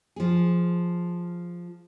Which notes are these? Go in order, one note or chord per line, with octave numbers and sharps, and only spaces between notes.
F3 G#4